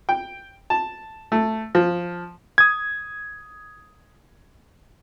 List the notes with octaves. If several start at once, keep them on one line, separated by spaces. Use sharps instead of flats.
G5
A5
A3
F3
D#6 G#6